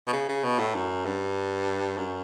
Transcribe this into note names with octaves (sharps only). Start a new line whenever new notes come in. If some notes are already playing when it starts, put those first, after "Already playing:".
B2
C#3
C#3
B2
A2
F#2
G2
F#2